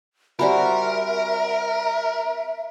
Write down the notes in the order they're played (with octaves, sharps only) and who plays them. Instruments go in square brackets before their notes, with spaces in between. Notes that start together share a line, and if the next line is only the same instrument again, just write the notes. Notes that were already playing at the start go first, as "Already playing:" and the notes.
[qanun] G3 C4 F#4 [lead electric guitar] A#4 [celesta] D5 G#5 B5 [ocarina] E5